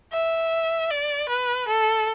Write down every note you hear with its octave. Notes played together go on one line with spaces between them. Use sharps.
E5
D5
B4
A4